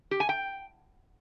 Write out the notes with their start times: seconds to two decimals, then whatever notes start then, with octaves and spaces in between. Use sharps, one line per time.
0.11 G4
0.20 G#5
0.29 G5